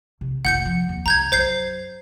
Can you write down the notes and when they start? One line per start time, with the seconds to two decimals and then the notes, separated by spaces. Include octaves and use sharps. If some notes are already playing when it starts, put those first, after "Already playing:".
0.21 C3
0.45 F1 F4 F#5 G6 C#7
0.65 F3
0.89 D#2
1.06 C2 G3 A#5 G6 G#6
1.32 F#2 C5 G6 C7